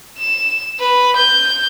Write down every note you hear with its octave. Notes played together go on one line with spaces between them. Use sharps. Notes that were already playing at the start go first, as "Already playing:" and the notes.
E7
B4
G6